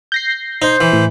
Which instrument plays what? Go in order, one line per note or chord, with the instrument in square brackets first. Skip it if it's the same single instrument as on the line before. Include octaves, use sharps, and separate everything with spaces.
[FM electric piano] G6 A#6 C7
[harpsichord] D#4 [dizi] C5
[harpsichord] E3
[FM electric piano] A2